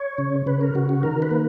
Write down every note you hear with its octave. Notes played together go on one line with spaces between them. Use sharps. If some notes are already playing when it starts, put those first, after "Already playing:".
Already playing: C#5
C#3
C#3 B4
A#4
C#3 F#4
F#4
D#3 A#4
B4
A#3